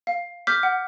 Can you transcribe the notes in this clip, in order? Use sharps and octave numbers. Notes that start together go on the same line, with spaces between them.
F5
D6 F6 G6 B6
F#5